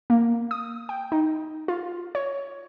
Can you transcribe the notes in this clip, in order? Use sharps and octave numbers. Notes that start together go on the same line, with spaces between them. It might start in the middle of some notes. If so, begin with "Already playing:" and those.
A#3
D#6
G5
D#4
F4
C#5